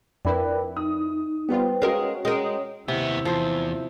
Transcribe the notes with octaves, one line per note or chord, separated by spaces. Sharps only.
F2 D4 E4 A#4 B4 G5
D#4 D#6
G3 B3 F4 G4 B4 C5 G5
G#3 C#4 F#4 A#4 F5
G#3 A#4 C#5 G5 D#6
D#2 C3 B3 E4
E2 F3 C5